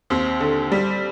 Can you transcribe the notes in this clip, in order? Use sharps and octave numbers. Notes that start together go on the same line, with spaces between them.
D#2 C4
D3
G3